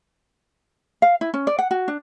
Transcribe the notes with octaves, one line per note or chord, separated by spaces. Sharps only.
F5
E4
C#4
D5
F#5
F#4
D4